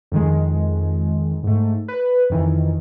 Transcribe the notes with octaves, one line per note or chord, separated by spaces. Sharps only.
F2 D#3 G#3
G#2 A3
B4
F2 D#3 E3